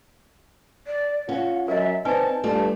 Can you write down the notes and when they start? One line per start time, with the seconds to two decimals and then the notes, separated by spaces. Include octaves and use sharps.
0.87 D5
1.29 C#4 F4 F#5
1.68 F#2 A#4 D#5 E5
2.05 C4 D#4 B4 D5 G#5 A5
2.44 G2 G3 A3 F4 A5